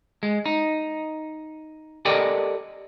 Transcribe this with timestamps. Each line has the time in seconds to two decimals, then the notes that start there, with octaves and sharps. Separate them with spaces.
0.23 G#3
0.46 D#4
2.05 G4 A4 A#4 D5 D#5 G5